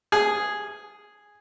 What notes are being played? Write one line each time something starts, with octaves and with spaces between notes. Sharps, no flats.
G#4